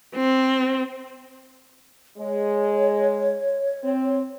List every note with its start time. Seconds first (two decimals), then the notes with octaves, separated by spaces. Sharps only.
0.15 C4
2.18 G#3 C#5
3.83 C4